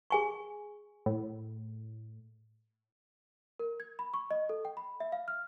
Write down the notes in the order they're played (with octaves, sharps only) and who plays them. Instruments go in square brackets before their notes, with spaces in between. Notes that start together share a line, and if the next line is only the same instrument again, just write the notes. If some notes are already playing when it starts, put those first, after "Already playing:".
[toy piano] G#4 G#5 C#6
[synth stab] A2
[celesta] A#4
G#6
B5
C#6
D#5
A4
G5
B5
E5
F5
F6